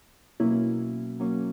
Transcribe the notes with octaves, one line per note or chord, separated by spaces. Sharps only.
B2 F#3 A#3 C#4 E4
F#3 A#3 C#4